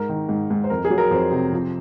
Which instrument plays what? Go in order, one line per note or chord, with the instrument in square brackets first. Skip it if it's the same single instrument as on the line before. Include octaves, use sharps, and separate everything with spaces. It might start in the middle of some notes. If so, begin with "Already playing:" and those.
Already playing: [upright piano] G#2 A#4
D#3
G#2
G#2
C5
F2 A#4
G#4
F#3
A#4
F2 C5
C3
F3